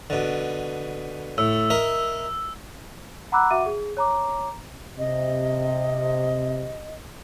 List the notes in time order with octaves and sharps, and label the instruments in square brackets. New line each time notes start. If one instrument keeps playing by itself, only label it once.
[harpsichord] B2 D3
[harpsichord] A2 [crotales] E6
[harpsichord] A#4 D#5 E5
[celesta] F#5 A#5 B5 D6 E6 F#6
F#4 E5 F#5 D6 D#7
G#4
C#5 A#5 D6
[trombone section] C3 [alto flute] D#5